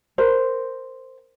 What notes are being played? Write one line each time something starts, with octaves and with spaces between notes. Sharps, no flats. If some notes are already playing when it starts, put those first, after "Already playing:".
A#4 C5